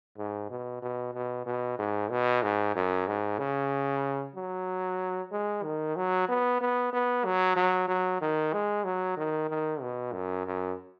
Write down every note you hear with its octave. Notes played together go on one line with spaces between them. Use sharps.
G#2
B2
B2
B2
B2
G#2
B2
G#2
F#2
G#2
C#3
F#3
G#3
D#3
F#3
B3
B3
B3
F#3
F#3
F#3
D#3
G#3
F#3
D#3
D#3
B2
F#2
F#2